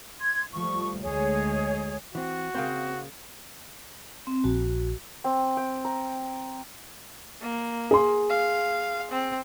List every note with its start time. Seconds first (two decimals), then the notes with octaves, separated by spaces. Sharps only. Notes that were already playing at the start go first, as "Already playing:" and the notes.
0.20 C6 G#6
0.54 F3 G3 A3 C#6
1.02 D2 G#3 G#4 C#5
2.15 E3 C4 F#4
2.55 C#3 A#3 C4 C5
4.27 C4
4.44 A#1 F#4
5.24 C4
5.57 G5
5.85 A#5
7.42 A#3
7.91 G#4 C6
8.30 F5
9.12 C4